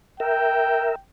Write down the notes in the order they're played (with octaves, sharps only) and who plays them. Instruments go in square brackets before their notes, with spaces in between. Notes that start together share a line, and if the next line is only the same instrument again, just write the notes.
[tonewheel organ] A#4 E5 [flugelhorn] G5